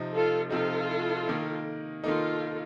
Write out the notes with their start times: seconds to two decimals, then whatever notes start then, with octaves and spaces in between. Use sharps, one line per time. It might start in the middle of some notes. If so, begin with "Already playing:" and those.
Already playing: C3 F3 C4 D#4
0.13 F4 A4
0.50 C3 F3 C4 D#4 F4 A4
1.27 D#3 A#3 D#4
2.04 D#3 A#3 D#4 F4 A4